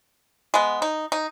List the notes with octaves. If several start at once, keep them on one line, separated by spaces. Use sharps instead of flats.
G#3 B3
D#4
D#4